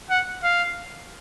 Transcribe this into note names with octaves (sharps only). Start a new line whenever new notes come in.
F#5
F5